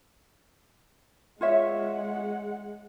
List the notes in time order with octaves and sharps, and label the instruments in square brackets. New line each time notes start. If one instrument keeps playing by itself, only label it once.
[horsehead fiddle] G#3 F#5 [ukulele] F4 C#5 E5